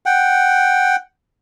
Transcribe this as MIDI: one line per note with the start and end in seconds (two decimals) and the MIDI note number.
0.06 0.96 78
0.06 0.96 79